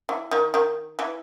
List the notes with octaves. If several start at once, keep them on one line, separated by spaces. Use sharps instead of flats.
E3
D#3
D#3
E3